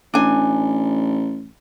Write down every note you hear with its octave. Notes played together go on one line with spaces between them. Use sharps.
A1 D4 G#5